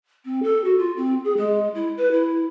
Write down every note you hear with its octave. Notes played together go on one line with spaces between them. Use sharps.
C4
A4
F#4
F4
C4
G#4
G#3
E4
B4
E4